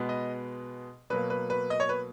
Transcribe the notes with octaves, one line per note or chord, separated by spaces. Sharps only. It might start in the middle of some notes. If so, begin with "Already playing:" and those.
Already playing: B2 G#3 B3
D#5
B2 F#3 A#3 B4
B4
B4
D#5
C#5
B4